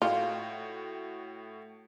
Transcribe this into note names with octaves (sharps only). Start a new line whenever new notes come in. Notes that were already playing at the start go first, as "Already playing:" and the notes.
A2 F4 F#4 G5